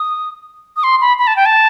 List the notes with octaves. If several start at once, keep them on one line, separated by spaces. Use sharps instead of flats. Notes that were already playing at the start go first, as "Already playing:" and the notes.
Already playing: D#6
D#6
C6
B5
B5
A5
G5
A5